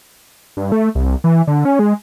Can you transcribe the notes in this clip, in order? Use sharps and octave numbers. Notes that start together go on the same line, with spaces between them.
G2
A3
C2
E3
D3
C#4
G#3